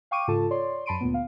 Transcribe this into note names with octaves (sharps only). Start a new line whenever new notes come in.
F5 G5 C#6 D6 D#7
G#2 C#3 F4 A4 A5
C#5 D5 C6
F#2 A5 B5 C6 D7 D#7
D2 A#2 B3
F5